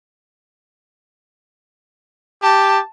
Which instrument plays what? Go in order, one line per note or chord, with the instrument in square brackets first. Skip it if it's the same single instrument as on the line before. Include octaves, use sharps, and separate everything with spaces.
[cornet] G4 [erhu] A5